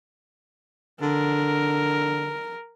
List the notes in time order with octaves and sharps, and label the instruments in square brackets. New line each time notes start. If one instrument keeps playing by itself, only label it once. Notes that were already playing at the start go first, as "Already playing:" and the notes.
[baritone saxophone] D3 [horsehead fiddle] A#4